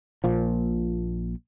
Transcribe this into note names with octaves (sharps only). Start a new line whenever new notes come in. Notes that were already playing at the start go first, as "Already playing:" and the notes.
A#1 A#2 F3